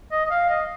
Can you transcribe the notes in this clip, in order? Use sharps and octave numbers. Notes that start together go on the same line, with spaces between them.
D#5
D#5
F5
D#5